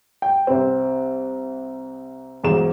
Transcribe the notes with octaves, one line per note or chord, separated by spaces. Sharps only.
G5
C2 C4
B1 E2 G#2 E7